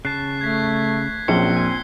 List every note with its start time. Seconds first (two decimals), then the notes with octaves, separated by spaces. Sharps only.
0.05 C#3 A5 F#6 C7
0.41 A3 G#6 B6
1.28 A#1 F#3 C4 C#4 C5 C#7 G7
1.57 G#5 C6